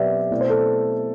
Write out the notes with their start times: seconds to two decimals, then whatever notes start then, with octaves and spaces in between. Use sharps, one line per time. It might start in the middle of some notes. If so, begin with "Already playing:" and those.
Already playing: B2 F#3 C4 G4 B4 D5 E5
0.31 B2 A3 C4 E4 D5
0.41 C5
0.50 A4